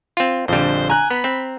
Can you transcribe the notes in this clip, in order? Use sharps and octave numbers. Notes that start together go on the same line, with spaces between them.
C4 F4
A#1 F2 D3 G3 C5
G#5 A#5 F#6
B3 B5
C4